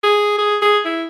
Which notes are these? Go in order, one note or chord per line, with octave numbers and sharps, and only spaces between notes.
G#4
G#4
G#4
E4